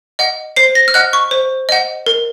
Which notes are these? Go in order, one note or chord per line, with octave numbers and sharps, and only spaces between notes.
D#5 F#5
C5 C7
A#6
F6
D#5 F#5 F#6
C#6
C5
D#5 F#5
A#4